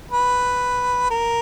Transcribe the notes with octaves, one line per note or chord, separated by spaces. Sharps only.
B4
A#4